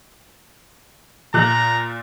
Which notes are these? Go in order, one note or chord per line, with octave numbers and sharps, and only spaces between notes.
A#2 A#5 F#6